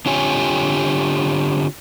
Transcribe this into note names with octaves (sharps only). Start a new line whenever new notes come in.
D3 C4 F4 G4 C#5 G#5